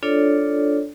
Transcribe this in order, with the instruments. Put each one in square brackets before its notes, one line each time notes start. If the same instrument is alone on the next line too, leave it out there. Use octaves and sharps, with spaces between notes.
[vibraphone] D4 F4 A4 C#5 D5